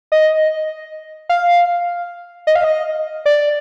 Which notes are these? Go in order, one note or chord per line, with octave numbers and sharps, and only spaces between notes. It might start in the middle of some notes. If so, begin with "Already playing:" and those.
D#5
F5
D#5
F5
D#5
D5